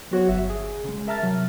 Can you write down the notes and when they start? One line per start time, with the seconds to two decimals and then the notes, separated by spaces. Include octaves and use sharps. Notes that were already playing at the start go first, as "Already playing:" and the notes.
0.11 F#3 B3 F#4 C#5 F#5
0.28 G1 E5
0.50 G#4
0.84 C#3 G#3
1.07 A#4 E5 A5 A#5 F6 A6
1.23 C3 F#3